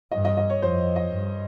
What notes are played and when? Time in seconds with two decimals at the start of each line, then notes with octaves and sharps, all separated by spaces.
0.12 G2 D#5
0.25 D#5
0.37 D#5
0.50 C#5
0.62 F2 C5
0.96 D#5
1.13 G2